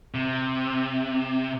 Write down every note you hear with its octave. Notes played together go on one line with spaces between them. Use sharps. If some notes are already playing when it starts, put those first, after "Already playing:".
C3